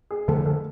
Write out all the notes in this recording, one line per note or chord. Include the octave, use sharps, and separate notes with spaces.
G#4
F#2 D3 F3 A3 A4
A4